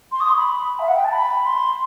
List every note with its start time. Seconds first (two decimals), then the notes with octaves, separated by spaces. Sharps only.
0.11 C6
0.20 D#6
0.28 C6
0.36 B5
0.79 E5
0.87 F#5
0.95 G5
1.04 A5
1.12 B5
1.45 C6